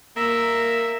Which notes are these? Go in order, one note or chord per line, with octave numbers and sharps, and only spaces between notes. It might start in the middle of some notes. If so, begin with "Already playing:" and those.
A#3 E5